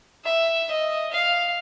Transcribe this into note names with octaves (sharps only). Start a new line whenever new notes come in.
E5
D#5
F5